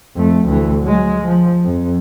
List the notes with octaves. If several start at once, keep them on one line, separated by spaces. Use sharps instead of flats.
F2 A3
D2 E3
F#3 G#3
F3
F2